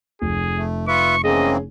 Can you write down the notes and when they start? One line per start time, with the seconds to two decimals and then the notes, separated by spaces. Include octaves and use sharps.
0.22 F1 G#4
0.58 A3
0.88 F4 B4 E5 C#6
1.24 E3 A#3 C4 C#4 G#4 D#5